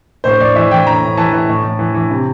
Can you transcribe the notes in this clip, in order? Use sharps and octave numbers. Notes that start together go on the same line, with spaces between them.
A2 C5
A2 D5
E3 E5
E3 G5
A2 A#5
A2
E3 A5
E3
A2
A2
E3
E3
C3